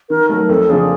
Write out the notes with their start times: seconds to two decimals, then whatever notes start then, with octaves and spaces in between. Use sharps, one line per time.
0.10 D#3 A#4
0.29 F#3 A3 A#4
0.49 F2 A4
0.69 C#3 F3 A#3 D4 G#4